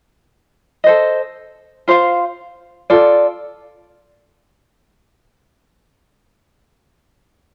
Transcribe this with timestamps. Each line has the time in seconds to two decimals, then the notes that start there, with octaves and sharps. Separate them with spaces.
0.84 A4 C5 D#5
1.88 F4 C5 F5
2.90 F4 A4 D5